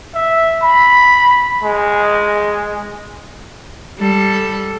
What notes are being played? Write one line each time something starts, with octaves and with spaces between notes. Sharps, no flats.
E5
B5
G#3
G3 A4